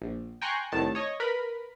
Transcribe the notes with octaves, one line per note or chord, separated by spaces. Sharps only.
A#1
G5 G#5 A#5 C6 C#6 F#6
C2 A2 D#3 A5
C#5 D#5
A#4 B4 B5